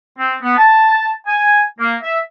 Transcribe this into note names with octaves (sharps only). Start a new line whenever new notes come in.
C4
B3
A5
G#5
A#3
E5